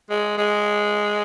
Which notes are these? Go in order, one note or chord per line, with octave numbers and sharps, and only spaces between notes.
G#3
G#3